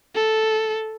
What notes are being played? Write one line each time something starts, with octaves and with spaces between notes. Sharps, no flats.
A4